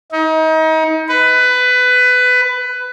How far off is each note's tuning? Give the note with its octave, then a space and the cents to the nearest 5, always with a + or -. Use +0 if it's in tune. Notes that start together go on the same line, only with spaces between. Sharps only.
D#4 +35
B4 +15